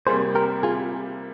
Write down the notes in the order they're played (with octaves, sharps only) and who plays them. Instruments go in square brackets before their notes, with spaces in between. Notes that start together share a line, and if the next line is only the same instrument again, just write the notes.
[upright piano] C3 G3 A#3 [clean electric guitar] G#4 C5
[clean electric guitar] G4 A#4
F4 G#4